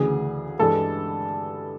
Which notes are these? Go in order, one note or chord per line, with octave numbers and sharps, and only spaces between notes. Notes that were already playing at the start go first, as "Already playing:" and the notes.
Already playing: D2 C#3 E3 G#4
G2 E3 G#3 A4